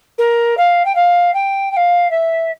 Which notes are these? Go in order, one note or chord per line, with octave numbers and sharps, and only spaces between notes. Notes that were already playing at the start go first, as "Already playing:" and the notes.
A#4
F5
G5
F5
G5
G5
F5
E5